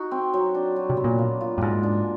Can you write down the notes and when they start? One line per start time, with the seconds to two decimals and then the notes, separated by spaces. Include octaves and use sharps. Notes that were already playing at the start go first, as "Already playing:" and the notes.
Already playing: D#4 F#4
0.11 C4
0.34 F#3
0.55 D4
0.76 F#3
0.90 C3
0.97 B3
1.04 A#2
1.18 A#3
1.41 F4
1.58 G2
1.61 G#2 A#3
1.83 D4